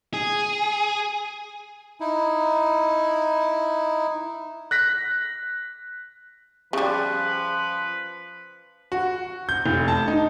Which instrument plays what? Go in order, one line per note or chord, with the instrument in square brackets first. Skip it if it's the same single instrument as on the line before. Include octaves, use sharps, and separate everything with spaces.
[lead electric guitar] G#4
[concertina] D#4 E4
[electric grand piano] F#6 A#6 B6
[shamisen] C#3 G3 [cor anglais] F3 [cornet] B4
[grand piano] F#4
G6
F1
A5
D#4